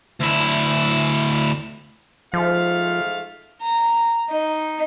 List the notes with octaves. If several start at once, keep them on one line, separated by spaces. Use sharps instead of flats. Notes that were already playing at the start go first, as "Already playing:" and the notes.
D2 E4
G#2 F3 A3 F5
A#5
D#4